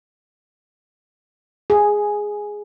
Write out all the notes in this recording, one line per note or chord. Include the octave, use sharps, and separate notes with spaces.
G#4